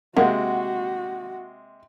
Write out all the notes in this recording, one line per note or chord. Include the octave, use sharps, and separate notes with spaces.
C3 G#3 A#3 F#4 F#5